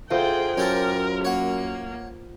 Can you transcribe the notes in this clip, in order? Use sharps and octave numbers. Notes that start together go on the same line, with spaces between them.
D2 F4 G#4 C5 G5
F#2 C#4 G4 A4 A#4
A#3 C#5 F#5